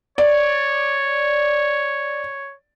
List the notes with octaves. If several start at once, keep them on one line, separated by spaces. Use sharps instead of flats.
C#5 D5